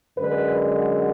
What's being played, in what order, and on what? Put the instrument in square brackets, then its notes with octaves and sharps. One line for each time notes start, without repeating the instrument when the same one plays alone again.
[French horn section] F#2 D3 G#3 B4